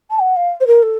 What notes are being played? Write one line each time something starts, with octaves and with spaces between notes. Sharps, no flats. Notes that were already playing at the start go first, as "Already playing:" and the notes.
A5
F#5
F5
C5
A#4
A4